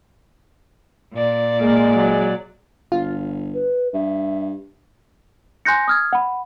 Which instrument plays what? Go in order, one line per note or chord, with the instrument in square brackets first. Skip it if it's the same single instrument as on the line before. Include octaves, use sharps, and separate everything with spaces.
[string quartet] A#2 D5
[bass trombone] G#3 [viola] A#3
[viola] F#3
[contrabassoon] G1 [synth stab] F4
[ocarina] B4
[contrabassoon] G2 [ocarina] E5
[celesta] G#5 C6 F#6 G6 A#6 C#7
D#6 F6 G#6
F#5 B5